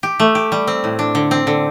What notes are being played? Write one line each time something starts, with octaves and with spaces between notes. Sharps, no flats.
G4
A3
G4
G3
C4
A2
D4
D3
C4
D3